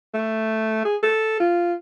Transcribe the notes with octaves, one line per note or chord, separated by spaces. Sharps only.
A3
G#4
A4
F4